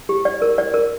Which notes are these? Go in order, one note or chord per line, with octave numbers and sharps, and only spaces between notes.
G4
D5
A#4
D5
A#4